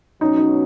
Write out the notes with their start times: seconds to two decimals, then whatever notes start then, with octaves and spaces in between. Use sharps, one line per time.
0.21 B2 F#3 C#4 D#4
0.37 D#4